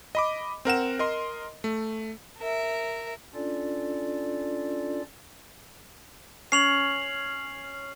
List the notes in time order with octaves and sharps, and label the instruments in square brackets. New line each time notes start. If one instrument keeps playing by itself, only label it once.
[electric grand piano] D#5 B5 D6
C4 A#4 F#5 E7
A#4 D#5 C6
A3
[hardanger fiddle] A#4 E5
[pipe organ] C#4 D4 F4 A4 D5
[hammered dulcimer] C#4 [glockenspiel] C7 F7 F#7